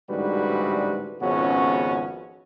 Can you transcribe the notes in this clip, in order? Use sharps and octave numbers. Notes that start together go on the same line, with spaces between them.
A1 G#2 D3 G3 F#4 B4
G#1 F2 C#3 B3 C#4 F#4